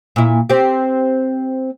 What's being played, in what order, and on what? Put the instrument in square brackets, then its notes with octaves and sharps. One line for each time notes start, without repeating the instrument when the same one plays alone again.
[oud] A#2 E4
C4 G4